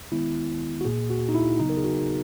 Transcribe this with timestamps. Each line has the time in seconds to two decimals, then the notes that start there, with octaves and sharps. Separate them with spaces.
0.12 D#3 G#3 B3 E4
0.81 F#4
0.85 A#2 A#3 G#4
1.10 F#4
1.29 D#4
1.35 E4
1.59 C#3 F#3 B3 D#4
1.69 A#4
1.77 G#4
1.84 F#4